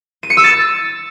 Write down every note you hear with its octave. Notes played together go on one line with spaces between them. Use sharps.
D#7
C#7
E6
A6